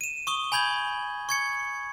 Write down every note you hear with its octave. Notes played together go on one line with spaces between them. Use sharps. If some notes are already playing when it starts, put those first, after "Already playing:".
D#7 E7
C#6 D#6 G7
G#5 B5 G6 G#6 F#7
C#6 G#6 C#7